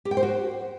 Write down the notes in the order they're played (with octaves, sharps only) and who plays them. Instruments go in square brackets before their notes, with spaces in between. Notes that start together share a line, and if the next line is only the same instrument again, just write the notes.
[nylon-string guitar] G4
G5
C5
F#4